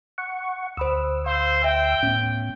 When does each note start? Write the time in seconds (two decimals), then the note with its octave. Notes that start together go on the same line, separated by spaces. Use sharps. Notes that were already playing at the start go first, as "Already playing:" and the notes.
0.18 F#5 C#6
0.77 D2 C5 B5 D#6 E6
1.26 C5 F5
1.64 E5 G5
2.03 A2 B3 C#4